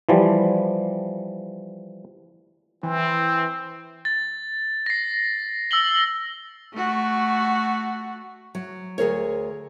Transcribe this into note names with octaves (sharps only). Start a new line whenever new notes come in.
E3 F3 G3
E3 C4
A6
A#6 C7
E6 A#6 F#7 G7
A3 F#4
F#3
D2 G#4 A#4 C#5